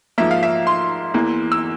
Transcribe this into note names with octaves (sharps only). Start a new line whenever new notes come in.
G#2 F3 A#3 E5
F5
E5
C6
E2 E3 A#3
E6